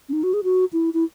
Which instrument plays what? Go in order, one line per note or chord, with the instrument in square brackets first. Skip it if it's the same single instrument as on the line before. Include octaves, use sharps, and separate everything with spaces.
[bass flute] C#4
D#4
F#4
G#4
F#4
E4
E4